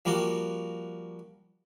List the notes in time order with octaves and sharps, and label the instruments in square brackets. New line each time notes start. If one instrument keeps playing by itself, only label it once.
[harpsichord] F3 G3 A#3 F#4